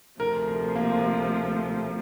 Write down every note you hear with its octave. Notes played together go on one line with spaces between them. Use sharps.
D2 C3 F3 A#4
A#4
A#3